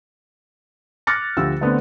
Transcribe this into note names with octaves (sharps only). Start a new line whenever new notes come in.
D6 F6 F#6 A6 A#6 C#7
D2 F3 G4 E6
D3 A3 B3 C4